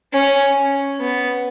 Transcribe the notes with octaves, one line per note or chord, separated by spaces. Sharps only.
C#4
B3